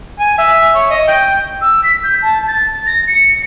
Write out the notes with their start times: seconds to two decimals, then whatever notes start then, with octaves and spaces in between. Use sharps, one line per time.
0.19 G#5
0.38 E5
0.75 C#5
0.90 D#5
1.08 G5
1.61 E6
1.84 B6
2.04 G6
2.22 A5
2.47 A6
2.87 A#6
3.08 C#7